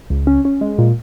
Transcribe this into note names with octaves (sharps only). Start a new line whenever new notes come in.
C#2
C#4
C#4
G#3
A#2